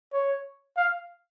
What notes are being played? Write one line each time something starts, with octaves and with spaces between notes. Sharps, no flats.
C#5
F5